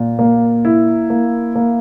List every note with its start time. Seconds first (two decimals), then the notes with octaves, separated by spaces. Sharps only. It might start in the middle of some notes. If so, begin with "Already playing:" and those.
Already playing: A#2
0.19 A#3
0.65 E4
1.10 A#3
1.56 A#3